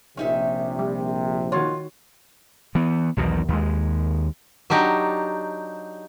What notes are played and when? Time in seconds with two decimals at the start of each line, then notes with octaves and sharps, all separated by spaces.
0.17 A#1 C3 C#4 D#4 E5
0.79 G3
1.52 D#3 F4 F#4 C#5
2.75 E3 B3
3.17 B1 E2 B2 D#3
3.49 D#2 G#3
4.70 F#3 D4 D#4 G4